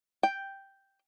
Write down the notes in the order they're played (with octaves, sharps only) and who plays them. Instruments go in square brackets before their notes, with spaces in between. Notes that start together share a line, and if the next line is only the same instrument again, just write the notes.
[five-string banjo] G5